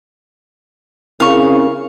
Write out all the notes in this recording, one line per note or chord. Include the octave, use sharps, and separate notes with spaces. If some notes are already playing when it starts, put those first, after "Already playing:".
C#3 C4 E4 A#4 F5 C#6